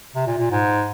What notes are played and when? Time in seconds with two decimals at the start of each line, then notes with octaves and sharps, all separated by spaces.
0.15 C3
0.27 A#2
0.38 A#2
0.51 G#2